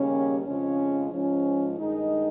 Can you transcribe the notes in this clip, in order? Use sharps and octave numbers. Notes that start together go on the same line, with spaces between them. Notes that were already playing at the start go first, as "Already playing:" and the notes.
Already playing: D#2 C#3 G3 C#4
F2 C#3 F3 G#3 C#4
G#2 F3 G#3 C#4
G2 D#3 G#3 D#4